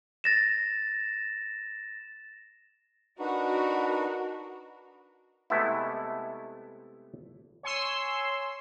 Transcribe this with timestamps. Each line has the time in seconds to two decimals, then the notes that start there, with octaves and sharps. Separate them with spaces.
0.24 A6 A#6 E7
3.20 D4 D#4 F#4 A#4 B4
5.50 C3 G#3 A3 B3 E4
7.63 C#5 G#5 C6 E6